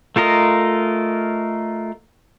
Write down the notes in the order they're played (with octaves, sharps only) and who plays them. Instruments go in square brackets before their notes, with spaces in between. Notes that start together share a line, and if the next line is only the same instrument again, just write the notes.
[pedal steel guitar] A3 F4 A#4 D#5